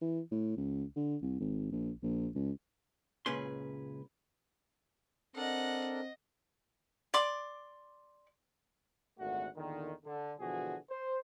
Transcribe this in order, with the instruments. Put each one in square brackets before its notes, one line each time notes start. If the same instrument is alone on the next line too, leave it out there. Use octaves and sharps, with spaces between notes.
[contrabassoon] E3
A2
C#2
D3
C2
G#1
A#1
A#1
C#2
[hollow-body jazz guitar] C#2 A#2 C#4 G#4 B4 C6
[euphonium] C4 [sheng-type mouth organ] D4 A4 A#4 [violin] D#5 [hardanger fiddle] F#5
[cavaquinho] D5 C6 D6
[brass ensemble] G#1 D2 A#2 A3 F#4 F#5
E2 A#2 D3 D#3
D3
B2 D3 E3 F3 F#4 G#4
C5